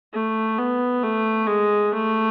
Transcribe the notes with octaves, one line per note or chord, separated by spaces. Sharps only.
A3
B3
A3
G#3
A3